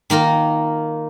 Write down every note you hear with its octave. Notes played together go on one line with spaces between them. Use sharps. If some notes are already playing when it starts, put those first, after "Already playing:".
D#3 A#3 F4 A#4